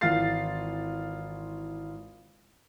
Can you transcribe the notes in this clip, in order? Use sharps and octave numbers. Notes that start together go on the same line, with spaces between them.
G#1 E3 F4 F5 A6 C7